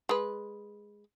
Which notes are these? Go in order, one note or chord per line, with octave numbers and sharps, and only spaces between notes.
G#3 B4